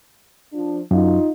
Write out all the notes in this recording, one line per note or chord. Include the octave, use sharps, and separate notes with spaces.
F3 D4
F#2 D#4 F4